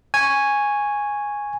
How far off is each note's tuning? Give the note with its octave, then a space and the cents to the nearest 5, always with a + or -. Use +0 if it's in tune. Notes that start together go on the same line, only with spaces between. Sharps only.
G#5 -5 C#6 +0